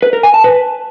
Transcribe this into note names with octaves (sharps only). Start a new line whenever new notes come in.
B4
A#4
G#5
A5
B4